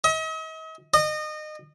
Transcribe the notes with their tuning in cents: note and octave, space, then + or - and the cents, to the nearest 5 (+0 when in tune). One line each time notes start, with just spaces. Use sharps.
D#5 +45
D#5 -25